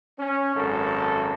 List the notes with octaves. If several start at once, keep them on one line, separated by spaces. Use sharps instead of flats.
C#4
G#1 F#2 A4